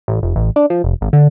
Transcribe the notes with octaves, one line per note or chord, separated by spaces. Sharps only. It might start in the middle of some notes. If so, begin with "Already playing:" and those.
A1
F1
A1
D4
F3
F1
G#1
D3